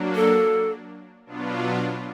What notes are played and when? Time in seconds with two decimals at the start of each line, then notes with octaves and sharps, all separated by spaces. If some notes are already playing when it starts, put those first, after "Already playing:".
Already playing: F#3 A#3 D4
0.15 A4
1.26 B2 F#3 B3 D4 F4